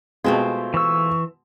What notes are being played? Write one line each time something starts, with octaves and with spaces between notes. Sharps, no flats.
B2 G#3 A3 C4 F4
E3 C#6 E6